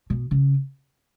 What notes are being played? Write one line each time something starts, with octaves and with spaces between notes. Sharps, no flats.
B2
C#3